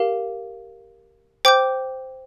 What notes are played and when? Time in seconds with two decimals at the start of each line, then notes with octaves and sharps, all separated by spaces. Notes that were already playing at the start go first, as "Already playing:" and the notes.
Already playing: G4 A#4 F5
1.45 C5 G5 D6 G6